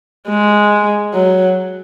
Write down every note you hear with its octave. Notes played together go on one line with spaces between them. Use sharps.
G#3
F#3